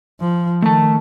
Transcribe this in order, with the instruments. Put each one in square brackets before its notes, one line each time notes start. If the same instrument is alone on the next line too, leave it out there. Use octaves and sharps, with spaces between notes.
[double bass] F3
[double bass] D#3 [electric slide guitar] A3 A5